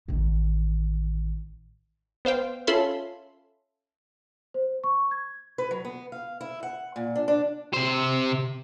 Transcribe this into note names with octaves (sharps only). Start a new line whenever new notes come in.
A1 D#3
B3 C5 F5 G5
C#4 F4 A4 E5 B5 C6
C5
C#6
G#6
B4
F#3
B3
F5
E4
F#5
A#2
D4
D4
C3 C5